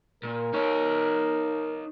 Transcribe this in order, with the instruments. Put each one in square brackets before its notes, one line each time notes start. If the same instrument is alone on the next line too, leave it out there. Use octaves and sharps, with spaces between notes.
[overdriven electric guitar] A#2 [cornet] A#4
[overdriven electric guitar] D#4 C#5